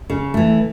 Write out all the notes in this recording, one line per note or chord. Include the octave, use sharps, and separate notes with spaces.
C#3
E3 A3